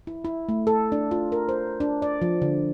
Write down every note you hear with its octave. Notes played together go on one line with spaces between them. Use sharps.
E4
E4
A3
A4
D4
F4
A#4
C5
D4
D5
F3
D3